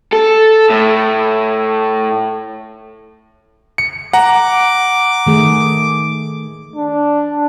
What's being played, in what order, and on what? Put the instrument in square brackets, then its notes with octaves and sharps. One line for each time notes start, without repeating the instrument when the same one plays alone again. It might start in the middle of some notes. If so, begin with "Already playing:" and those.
[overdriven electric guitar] A4
A2
[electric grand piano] C#7
[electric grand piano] F#5 A#5 [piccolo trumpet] D6
[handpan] D#3 A3 G#4
[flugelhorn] D4